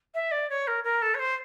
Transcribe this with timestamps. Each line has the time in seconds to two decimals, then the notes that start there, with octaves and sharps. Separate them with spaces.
0.14 E5
0.31 D5
0.49 C#5
0.67 A#4
0.84 A#4
1.02 A4
1.14 C#5
1.19 C5